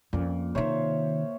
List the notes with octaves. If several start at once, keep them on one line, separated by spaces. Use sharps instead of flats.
F2 A#2 C#4
C3 D#3 C5 C#5 E5